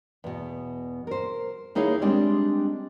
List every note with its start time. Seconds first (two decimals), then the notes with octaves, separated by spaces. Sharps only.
0.24 E2 B2
1.07 A#4 C5
1.75 D#2 D#4 E4 G#4 C#5 F5
2.02 G3 G#3 C4 D4